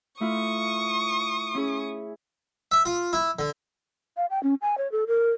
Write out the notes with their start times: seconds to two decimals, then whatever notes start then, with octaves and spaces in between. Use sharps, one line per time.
0.20 A3 E4 F4 C#6 D#6
1.55 C#4 E4 G#4
2.72 E5
2.85 F4
3.13 E4
3.39 D3
4.17 F5
4.30 G5
4.43 C#4
4.61 G#5
4.78 C#5
4.92 A4
5.07 A#4